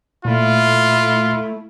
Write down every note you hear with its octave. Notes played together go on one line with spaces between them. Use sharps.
A#2 A3 E4 F4